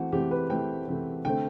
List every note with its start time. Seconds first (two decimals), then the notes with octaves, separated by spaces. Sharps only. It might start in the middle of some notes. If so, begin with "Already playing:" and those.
Already playing: E3 A3 C4 F#4
0.12 E3 A3 C4 G4
0.31 B4
0.50 E3 A3 C4 G5
0.88 E3 A3 C4
1.25 D3 A3 C4 G5